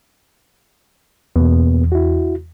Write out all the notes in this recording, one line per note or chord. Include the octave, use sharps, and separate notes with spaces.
E2 B2 A#3 B3
E4 F#4